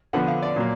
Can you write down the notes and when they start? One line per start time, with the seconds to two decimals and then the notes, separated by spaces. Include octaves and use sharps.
0.13 D3 F3 B3 F#5
0.28 F5
0.42 D5
0.56 A#2 F#3 A#3